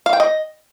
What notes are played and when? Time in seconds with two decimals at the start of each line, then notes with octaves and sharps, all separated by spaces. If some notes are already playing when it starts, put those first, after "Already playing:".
0.06 F5
0.13 G5
0.20 D#5